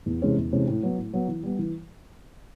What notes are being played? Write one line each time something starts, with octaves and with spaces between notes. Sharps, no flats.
E2
C3 E3 G#3 C#4
E2
C3 E3 G#3 C#4
A2
F#3 B3
A2
F#3 B3
E3
G3 B3
E3